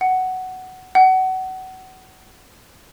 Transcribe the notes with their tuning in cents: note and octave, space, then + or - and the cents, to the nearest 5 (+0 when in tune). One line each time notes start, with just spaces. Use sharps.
F#5 +10
F#5 +25